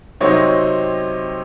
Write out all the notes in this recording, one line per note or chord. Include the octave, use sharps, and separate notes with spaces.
C3 F#3 C4 D#4 C#5
D#5
C#5